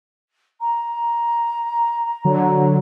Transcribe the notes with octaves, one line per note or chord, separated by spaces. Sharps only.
A#5
D3 F#3